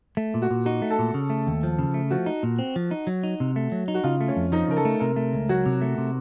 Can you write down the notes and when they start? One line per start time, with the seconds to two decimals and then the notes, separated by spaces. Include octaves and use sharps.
0.17 A3
0.34 A#2
0.42 F#4
0.50 A#2
0.65 D#4 F#4
0.82 A3
0.90 A4
0.99 A#2
1.14 C#3
1.30 A3
1.47 D#2
1.63 F3
1.79 C#3
1.94 A3
2.10 F3 F#4
2.26 D#4
2.43 A#2
2.59 C4
2.76 F3
2.91 D#4
3.07 F#3
3.23 D#4
3.40 C3
3.56 A3
3.72 F#3
3.88 D#4
3.94 F#4
4.04 C#3 F4
4.21 A3
4.28 C#4
4.36 F2
4.52 F3 D#4
4.68 C#3 A#4
4.76 A4
4.85 A3
5.00 C3 A#4
5.16 A3
5.33 C#2
5.49 F#3 F#4
5.66 C3
5.81 A3
5.98 C3